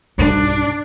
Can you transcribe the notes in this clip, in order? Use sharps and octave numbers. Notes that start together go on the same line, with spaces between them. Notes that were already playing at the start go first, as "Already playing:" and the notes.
B1 G2 D4